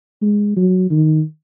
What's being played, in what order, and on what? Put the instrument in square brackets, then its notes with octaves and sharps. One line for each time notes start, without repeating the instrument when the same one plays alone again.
[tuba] G#3
F#3
D#3